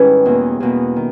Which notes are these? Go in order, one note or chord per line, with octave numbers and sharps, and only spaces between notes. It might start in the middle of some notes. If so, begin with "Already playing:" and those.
Already playing: G#2 D#3 G3 C#4 E4 B4
E2 B2 A#3
E2 B2 A#3
D#3